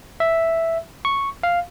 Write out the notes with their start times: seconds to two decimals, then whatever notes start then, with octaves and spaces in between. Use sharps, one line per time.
0.20 E5
1.05 C#6
1.43 F5